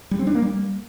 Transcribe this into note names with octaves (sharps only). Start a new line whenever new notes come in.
G3
C4
D4
A#3
G3